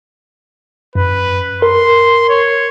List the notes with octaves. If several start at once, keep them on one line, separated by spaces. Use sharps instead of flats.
F#2 B4
A#4 C6
C#5